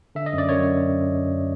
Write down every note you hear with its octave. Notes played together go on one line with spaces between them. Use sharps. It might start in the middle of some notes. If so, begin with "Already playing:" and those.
D3 E5
D#5
F#2
D5
F#2 C#5